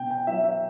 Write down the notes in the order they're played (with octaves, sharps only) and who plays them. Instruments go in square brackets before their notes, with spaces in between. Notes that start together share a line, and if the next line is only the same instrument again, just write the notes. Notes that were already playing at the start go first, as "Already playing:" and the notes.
Already playing: [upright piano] B2 G5
G5
F#3 E5
E5